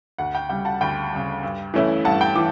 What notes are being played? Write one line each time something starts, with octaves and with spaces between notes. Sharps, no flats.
D2 F#5
G5
C#3 G3 G5
F#5 A5
D2 G5 B5
C#3 G3
G2
E3 A3 C#4 E4
G2 F#5 A5
G5
E3 D6